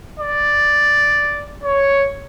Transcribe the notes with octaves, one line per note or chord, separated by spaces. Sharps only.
D5
C#5